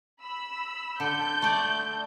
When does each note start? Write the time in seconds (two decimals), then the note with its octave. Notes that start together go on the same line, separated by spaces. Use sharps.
0.22 B5 E6
1.00 D3 A4 G6
1.42 A3 D5